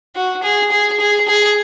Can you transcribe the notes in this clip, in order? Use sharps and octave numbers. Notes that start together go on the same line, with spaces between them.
F#4
G#4
G#4
G#4
G#4